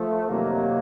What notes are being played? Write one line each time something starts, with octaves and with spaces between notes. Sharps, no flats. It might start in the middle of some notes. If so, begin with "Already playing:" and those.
Already playing: F3 A3
F2 C3 D#3 F#3 A#3